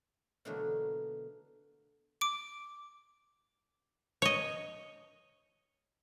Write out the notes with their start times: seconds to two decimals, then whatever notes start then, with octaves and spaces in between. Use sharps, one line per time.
0.45 B2 D3 E3 F#3 A3 A#3
2.21 D6 D7
4.22 C#5 D#5